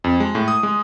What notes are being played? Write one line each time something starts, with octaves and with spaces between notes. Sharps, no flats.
F2
G#3
A2
D#6
G#3